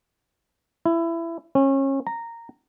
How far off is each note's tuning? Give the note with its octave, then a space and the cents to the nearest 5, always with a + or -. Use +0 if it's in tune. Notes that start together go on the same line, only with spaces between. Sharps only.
E4 +20
C#4 -30
A#5 -10